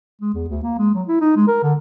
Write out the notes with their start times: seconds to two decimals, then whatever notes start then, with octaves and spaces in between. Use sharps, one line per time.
0.21 G#3
0.34 E2
0.49 D2
0.63 A#3
0.78 G#3
0.95 F#3
1.07 E4
1.21 D#4
1.36 G#3
1.48 A#4
1.63 D3